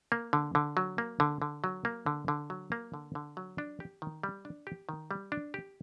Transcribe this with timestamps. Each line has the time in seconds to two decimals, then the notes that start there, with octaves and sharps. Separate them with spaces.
0.12 A#3
0.33 D3
0.55 D3
0.77 F#3
0.98 A#3
1.20 D3
1.42 D3
1.64 F#3
1.85 A#3
2.06 D3
2.28 D3
2.50 F#3
2.72 A#3
2.94 D3
3.15 D3
3.37 F#3
3.58 D4
3.80 G4
4.02 D#3
4.23 G3
4.45 D4
4.67 G4
4.89 D#3
5.11 G3
5.32 D4
5.54 G4